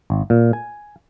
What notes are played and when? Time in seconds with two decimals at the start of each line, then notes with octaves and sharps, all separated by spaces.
0.10 G#1
0.30 A#2
0.53 G#5